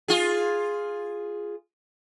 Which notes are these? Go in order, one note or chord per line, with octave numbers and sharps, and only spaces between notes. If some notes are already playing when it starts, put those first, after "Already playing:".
F4 G#4